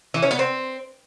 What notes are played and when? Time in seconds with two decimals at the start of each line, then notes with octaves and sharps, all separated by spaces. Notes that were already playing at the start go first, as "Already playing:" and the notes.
0.14 E3
0.22 C#4
0.31 B3
0.39 C4